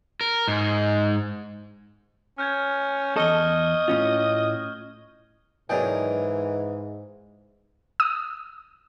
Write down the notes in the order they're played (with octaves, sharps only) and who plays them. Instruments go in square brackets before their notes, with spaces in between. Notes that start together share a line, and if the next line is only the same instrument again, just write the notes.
[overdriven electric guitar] A#4
G#2
[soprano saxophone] C#4 [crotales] F6 G6 G#6
[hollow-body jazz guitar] E2 A4 [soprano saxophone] D#5 [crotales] C#6 F6 G7
[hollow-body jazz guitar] A2 C#4 F4
[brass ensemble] G#2 [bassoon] E3 [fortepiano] F#3 D5 G5 [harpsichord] D#4 G#4 A#4
[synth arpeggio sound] D#6